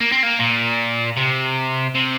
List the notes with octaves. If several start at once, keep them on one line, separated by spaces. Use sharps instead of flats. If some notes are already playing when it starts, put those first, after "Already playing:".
A#3
C4
A#3
A#2
C3
C3